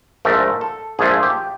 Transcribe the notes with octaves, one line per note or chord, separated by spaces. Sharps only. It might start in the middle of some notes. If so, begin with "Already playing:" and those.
A#1 G#2 F3 A3 A#4
A4
A#1 G#2 F3 A3 G#4
G4